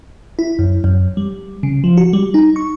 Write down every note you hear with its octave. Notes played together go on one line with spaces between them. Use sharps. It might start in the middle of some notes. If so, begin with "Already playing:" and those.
E4
F#2
F#2
G3
C#3
F3
F#4
G3
D#4
C#6